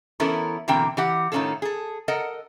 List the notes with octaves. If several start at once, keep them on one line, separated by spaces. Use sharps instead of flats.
E3 B3 C#4 E4 A4 A#4
B2 D3 E3 A#3 C4 G5
E3 G4 F#5
A2 D#3 A3 C#4 F4 A4
G#4 A4
A4 A#4 D#5 F#5